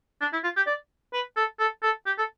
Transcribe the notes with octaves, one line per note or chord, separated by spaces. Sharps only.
D4
E4
F4
G4
D5
B4
A4
A4
A4
G4
A4